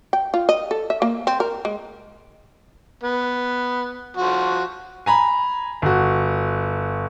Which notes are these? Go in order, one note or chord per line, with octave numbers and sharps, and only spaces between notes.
G5
F4
D#5
A4
E5
A#3
C4
A#4
G#3
B3
F3 F#4
G#5 A#5 B5
G1 F#4